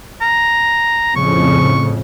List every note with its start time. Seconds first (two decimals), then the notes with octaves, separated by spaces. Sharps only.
0.22 A#5
1.16 F2 A2 C#3 C#6